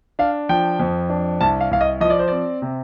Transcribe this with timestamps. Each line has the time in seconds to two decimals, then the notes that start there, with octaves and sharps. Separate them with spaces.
0.19 D4 F5
0.49 F3 G5
0.80 F2
1.10 D4
1.41 C2 A5
1.61 F5
1.71 C2 F5
1.81 D#5
2.01 F3 D#5
2.10 D5
2.19 C5
2.28 C4 D5
2.62 C3